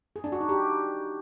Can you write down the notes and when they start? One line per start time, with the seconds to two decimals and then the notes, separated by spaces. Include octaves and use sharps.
0.16 G#4
0.24 D4
0.32 F#4
0.41 D#4
0.49 G4